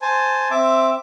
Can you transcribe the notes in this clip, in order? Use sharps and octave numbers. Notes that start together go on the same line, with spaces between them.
C5 G#5 A5
C4 E5 D6